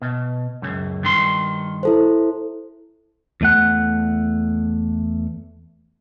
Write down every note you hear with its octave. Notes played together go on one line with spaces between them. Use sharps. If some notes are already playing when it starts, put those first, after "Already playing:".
B2
C#2 F#2
G2 D#3 C6
E4 A4 C5
E2 A3 F#5